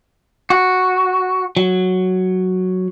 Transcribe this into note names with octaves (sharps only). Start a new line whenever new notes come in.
F#4
F#3